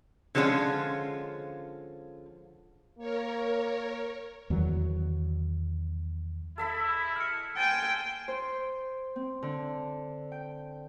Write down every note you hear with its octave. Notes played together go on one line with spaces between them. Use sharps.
D3 F3 G#3 B3 C#4 F4
A#3 A#4 C#5
E2 D#3 F#3
G#3 E4 A4 E5 B5
F6 C#7
C5 G5 G#5 A6
C5
C4
D3
G5